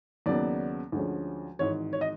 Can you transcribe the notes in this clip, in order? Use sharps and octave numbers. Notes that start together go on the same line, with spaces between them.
D#2 C#3 F#3 B3 D5
D2 D3 F3 G#3 C#4
G#1 G#2 E3 C#5
C#5
D#5